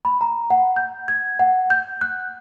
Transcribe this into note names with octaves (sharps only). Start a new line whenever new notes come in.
B5
A#5
F#5
G6
G#6
F#5
G6
F#6